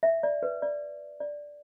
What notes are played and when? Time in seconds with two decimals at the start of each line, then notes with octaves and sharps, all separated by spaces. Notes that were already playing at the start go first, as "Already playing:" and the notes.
0.03 E5
0.23 D5
0.43 B4
0.62 D5
1.20 D5